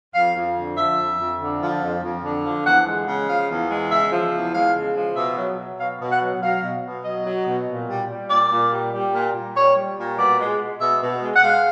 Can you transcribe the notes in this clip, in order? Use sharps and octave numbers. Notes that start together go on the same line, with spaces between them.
F2 F5
F2
D3
F3 E5
F2
F2
D3
F3
F2
F2
D3
F3
E2 F#5
G#3
C#3
F3 F5
E2
G#3
C#3 E5
F3
E2
G#3 F5
C#3
F3
B2 E5
F#3
F#3
B2 F5
B2
F#5
F#3
F#3 F5
B2
B2
F#3 D#5
F#3
B2
A#2
G3
G3
A#2 D5
A#2
G3
G3
A#2
A#2
G3 C#5
G3
A#2
B2 D5
G#3
G#3
B2 E5
B2
G#3
F#5
G#3 F5